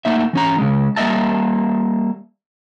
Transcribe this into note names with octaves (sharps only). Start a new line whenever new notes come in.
A3 A#3 D#4 E5
E3 C#4 A#5
C#3 G#3
G3 A#3 G#4 D#5 E5 A5